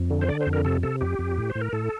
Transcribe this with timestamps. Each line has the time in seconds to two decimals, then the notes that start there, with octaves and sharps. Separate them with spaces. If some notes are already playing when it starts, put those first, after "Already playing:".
Already playing: F2
0.10 D3
0.21 C5
0.28 D3 D5
0.41 C5
0.46 F2
0.53 A#4
0.65 C3 A4
0.83 C3 A4
1.01 F2 G4
1.19 F2
1.37 A2
1.50 C5
1.55 A2
1.61 A#4
1.73 A2 A4